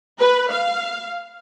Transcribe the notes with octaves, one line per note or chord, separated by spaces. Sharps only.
B4
F5